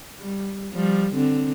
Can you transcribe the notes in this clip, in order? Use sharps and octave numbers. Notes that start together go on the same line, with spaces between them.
G3
F3 G3
D3 C4